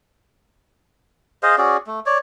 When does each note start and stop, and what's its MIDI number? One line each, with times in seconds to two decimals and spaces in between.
1.43 1.56 68
1.43 1.56 72
1.43 1.56 75
1.43 1.56 77
1.58 1.77 61
1.58 1.77 66
1.58 1.77 68
1.58 1.77 74
1.87 2.00 57
2.06 2.18 73
2.06 2.18 74